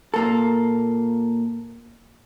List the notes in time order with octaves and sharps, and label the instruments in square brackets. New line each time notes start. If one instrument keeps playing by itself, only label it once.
[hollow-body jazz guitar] A#2 A#3 A4